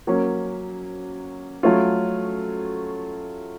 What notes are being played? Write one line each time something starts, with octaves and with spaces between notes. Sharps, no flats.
F#3 A#3 C#4
F#3 A3 C#4 F4